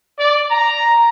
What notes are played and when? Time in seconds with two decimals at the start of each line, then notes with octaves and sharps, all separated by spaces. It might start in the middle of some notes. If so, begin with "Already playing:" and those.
0.19 D5
0.51 A#5